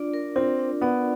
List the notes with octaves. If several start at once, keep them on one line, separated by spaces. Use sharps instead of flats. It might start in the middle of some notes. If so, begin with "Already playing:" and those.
Already playing: D4 F4 D5
A#4
C4 F4
D4
B3 D5